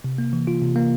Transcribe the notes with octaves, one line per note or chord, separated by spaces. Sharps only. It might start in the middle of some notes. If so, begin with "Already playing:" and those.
C3
A#3
E3
F4
C3
A#3